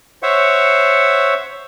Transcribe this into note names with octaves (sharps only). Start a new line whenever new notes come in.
C5 C#5 E5 F#5 C#6